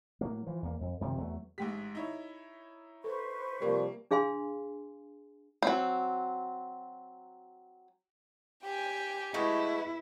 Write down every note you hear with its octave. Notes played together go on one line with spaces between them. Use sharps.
A2 F#3 A#3
E3 F3
E2 A#3
F2
F#2 C3 D#3 F3
E2 F#3 A3
A1 G#2 G4 G5 B6
D#4 E4 C#5
A4 B4 C5 C#6
C3 F3 G3 A#3 A#4
D4 G#4 F5 G#5 C6
F#3 C4
G4 G5 G#5
G#3 A3 E4 F#4 B4